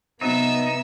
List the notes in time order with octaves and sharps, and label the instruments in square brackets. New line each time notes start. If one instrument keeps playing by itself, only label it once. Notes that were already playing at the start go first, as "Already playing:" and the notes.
[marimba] C3 F#3 F#4 [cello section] B3 [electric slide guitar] D#4 [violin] E5 E6